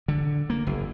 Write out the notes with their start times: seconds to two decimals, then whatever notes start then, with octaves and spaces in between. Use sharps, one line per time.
0.08 D3
0.50 A#3
0.67 F#1